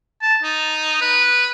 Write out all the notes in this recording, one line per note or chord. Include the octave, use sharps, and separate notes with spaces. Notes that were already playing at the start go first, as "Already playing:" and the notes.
A5
D#4
B4